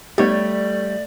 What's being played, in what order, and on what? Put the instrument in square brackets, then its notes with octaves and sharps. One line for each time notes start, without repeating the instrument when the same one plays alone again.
[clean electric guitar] G3 C#5 [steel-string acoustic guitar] A3 [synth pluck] B3 D#4 G4 [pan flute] D5